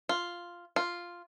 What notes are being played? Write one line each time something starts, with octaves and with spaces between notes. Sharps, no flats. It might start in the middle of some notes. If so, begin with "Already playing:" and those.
F4
F4